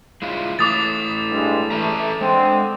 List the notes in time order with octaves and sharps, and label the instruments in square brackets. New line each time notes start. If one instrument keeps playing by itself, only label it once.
[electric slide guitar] G#3 E4 F4
[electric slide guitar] E3 A3 [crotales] D6 D#6 A6
[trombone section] G2 G#3
[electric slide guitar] E3 B4 A#5 [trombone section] A3
[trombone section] D3 C4 [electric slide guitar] G#3